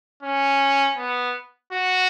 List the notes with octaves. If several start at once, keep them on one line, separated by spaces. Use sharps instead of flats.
C#4
B3
F#4